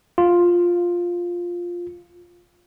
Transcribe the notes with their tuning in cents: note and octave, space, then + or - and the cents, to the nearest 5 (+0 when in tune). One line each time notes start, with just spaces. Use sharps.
F4 +5